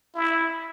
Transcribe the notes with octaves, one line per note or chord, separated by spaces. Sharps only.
E4